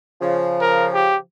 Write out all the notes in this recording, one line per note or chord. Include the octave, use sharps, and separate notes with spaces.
C#3 F3
A#4
G4